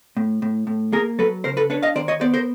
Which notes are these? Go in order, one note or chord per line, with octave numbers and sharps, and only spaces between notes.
A2
A2
A2
A#3 G#4 A#4
F#3 A4 B4
C#3 A#4 C5
A4 B4
D4 B4 C#5
D#5 F5
D#3 C5 D5
C#5 D#5
B3 C5 D5
A#4 C5